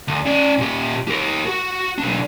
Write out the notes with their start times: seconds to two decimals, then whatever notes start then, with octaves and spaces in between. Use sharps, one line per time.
0.08 D2
0.26 C#4 D5
0.58 A#2 G4
1.08 G4 A#4
1.46 F#4
1.98 B1 D4